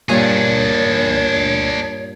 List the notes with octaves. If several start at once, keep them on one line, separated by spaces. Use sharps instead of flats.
G2 A#2 D4 G#4 C#5